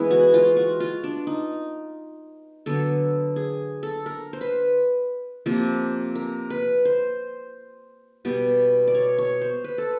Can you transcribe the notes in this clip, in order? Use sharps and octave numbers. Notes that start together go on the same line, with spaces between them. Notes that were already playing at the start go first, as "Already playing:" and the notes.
Already playing: E3 G#3 B3
F#4
F4
F#4
F4
D4
D#4
D3 F#3 B3 A4
G#4
A4
A#4
C5
B4
C3 F3 A#3
A#4
B4
C5
B2 G3 B3
D5
C#5
C#5
C5
B4
A4